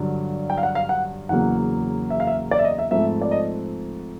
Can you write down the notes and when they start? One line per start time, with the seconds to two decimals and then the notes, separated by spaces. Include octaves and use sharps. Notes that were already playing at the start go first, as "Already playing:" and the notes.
Already playing: G2 D3 F#3
0.50 G5
0.58 F5
0.63 F#5
0.75 F5
0.89 F#5
1.29 E2 C#3 F#3 A#3 F#5
2.10 E5
2.20 F5
2.27 E5
2.51 D5
2.59 E5
2.64 D#5
2.78 E5
2.91 G#2 F3 A3 C4 E5
3.21 D5
3.31 D#5